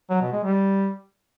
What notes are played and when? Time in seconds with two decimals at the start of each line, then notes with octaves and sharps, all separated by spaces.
0.10 F#3
0.21 B2
0.32 G#3
0.44 G3